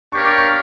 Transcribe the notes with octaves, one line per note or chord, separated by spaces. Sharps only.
D4 G4 A#4 C#5 F5 C#6
D6
C#6